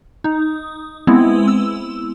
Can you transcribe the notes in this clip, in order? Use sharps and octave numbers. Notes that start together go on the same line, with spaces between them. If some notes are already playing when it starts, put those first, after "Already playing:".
D#4
G#3 B3 C4 E4
E6